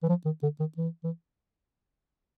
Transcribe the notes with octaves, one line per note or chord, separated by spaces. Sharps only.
E3
F3
D#3
D3
D#3
E3
E3